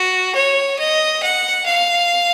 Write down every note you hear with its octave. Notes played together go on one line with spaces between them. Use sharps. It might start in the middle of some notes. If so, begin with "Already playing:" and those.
Already playing: F#4
C#5
D#5
F#5
F5